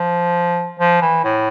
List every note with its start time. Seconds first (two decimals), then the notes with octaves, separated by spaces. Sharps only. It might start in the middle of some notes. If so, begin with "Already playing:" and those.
Already playing: F3
0.79 F3
1.02 E3
1.24 A2